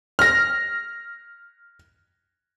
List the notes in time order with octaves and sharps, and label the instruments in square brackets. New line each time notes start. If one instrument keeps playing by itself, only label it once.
[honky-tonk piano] F6 A#6